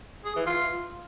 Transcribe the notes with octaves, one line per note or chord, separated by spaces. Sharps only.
G#4
E3
F4